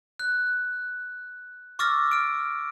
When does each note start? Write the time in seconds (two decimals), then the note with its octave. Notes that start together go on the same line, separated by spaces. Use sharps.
0.19 F#6
1.79 C#6 D6 E6 F6 A6 A#6
2.11 F6 D7